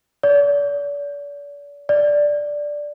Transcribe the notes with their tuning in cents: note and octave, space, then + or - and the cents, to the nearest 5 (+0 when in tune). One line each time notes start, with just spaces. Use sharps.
D5 -40
D5 +0